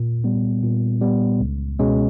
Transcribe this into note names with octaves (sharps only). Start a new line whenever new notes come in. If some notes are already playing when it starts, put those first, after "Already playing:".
Already playing: A#2
G3 B3
A#2
G3 B3
C#2
B2 G#3 C#4